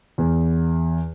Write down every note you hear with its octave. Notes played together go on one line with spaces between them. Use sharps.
E2